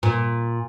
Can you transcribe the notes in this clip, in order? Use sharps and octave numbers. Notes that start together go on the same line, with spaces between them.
A#2